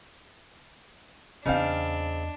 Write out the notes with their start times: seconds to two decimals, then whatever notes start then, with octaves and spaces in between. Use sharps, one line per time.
1.46 E2 C#3 C4 D4 E4 D#5 F5